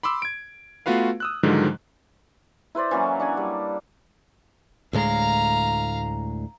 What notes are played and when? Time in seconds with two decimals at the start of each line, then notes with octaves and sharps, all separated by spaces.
0.03 B5 C6 D6 E6
0.22 G#6 D7
0.86 A3 B3 F4 F#4 B4 F5
1.20 D#6 E6 F#6
1.43 G#2 D3 D#3 F3 F#3 G#3
2.75 E4 B4 C5 D5
2.91 E3 F#3 A#3 C#4
3.20 D4 F#5 G#5
3.37 G3
4.93 D2 A2 G#3 F5 A#5